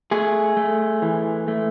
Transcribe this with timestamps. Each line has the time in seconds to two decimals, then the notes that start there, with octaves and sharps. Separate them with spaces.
0.11 A3 G#4
0.57 A3
1.02 E3
1.48 A3